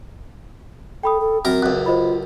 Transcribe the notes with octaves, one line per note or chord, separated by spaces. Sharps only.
A4 G5 B5 D#6
A4
F#2 C4 A#4 A#5
C#2 F#2 F#6
F4 C5 D#5 B5